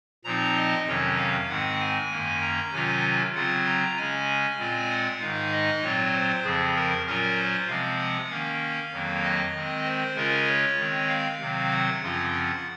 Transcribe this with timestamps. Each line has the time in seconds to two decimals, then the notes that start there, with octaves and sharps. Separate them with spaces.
0.24 A#2 F3 C4 D#4 A#5
0.56 D#5
0.87 F2 C3 D#3 F#3 C#4 C#5
1.18 F5
1.49 G#2 D#3 G#3 C4 F#5
1.80 G#5
2.11 F#2 D#3 A#3 C#4
2.41 A#5
2.72 C3 D#3 F#3 C#4 F4 G#5
3.35 C#3 F#3 C4 F4 F#5
3.66 A#5
3.97 C#3 G#3 C#4 G#5
4.59 A#2 G#3 C4 F4
4.90 F#5
5.20 G#2 D#3 G#3 D#4 F5
5.52 D#5
5.83 A#2 F#3 C4 F4 C#5
6.14 C5
6.44 F2 C#3 F3 C4 G#4
6.75 A#4
7.06 A#2 F#3 C#4 F4 A#4
7.37 C5
7.68 C3 F3 G#3 C4 F5
7.99 F#5
8.30 D#3 A#3 C#4 F5
8.92 F2 D#3 F#3 A#3
9.23 D#5
9.54 D#3 G#3 C4
9.84 C5
10.15 C#3 G#3 C#4 F4 A#4
10.47 C#5
10.78 D#3 G#3 C4
11.09 F5
11.40 C3 D#3 F#3 C4
11.71 F#5
12.02 F#2 C#3 F3 C4 F4